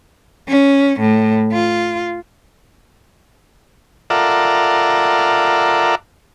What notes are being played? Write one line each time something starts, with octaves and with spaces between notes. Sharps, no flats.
C#4
A2
F4
F4 A4 A#4 D5 E5 F#5